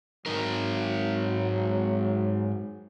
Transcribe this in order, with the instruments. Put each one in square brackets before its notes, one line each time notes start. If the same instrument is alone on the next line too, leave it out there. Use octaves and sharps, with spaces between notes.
[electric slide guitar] G#2 D#4 A#4 [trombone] F#3